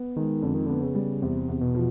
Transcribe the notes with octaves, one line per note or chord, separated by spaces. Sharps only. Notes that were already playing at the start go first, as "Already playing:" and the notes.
Already playing: B3
D#3 G#3
F2 D3
D#3
D3 B3
C#3
G3
E2 C3
E2
B2
F3